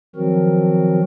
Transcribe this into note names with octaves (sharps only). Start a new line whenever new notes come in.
D#3 F3 F#3 C4 F#4 A#4